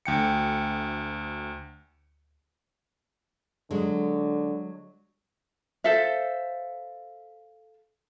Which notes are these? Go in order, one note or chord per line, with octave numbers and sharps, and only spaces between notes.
D2 G5 C#7
D3 F#3 G#3
A4 C5 E5 F5